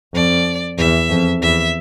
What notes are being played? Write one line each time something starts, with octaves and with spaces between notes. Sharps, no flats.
F2 D5
E2 E5
F2
E2 E5